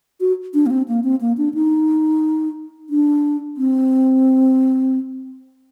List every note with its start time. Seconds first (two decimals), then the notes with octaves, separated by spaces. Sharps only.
0.20 F#4
0.54 D4
0.66 A#3
0.70 C4
0.88 A#3
1.04 C4
1.21 A#3
1.37 D4
1.54 D#4
2.90 D4
3.57 C4